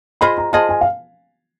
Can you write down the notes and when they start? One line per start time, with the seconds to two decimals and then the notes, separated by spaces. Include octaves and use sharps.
0.21 F4 G#4 C5 D#5 B5
0.38 A#5
0.53 F4 G#4 C5 D#5 A5
0.69 G#5
0.81 F5